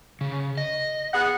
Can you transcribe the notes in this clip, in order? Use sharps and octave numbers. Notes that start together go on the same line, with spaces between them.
C#3
D#5
B3 G#4 F#5